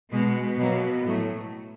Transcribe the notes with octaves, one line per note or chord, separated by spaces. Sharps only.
B2 G#3 B3
B2 F#3 A#3
A2 F#3 A3